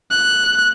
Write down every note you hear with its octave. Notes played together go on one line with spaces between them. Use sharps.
F#6